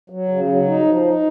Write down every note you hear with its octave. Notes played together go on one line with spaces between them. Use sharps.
F#3
C#3
F#3
D#4
F3
D#4